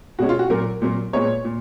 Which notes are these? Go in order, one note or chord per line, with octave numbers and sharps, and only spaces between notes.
B2 G#3 C#4 F#4
F4
F#4
A#2 F#3 A#3 A#4
A#2 F#3 A#3
A#2 G#3 B3 C#5
A#2